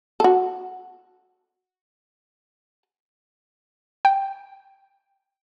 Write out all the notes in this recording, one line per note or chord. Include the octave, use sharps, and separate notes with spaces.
F#4 A4
G5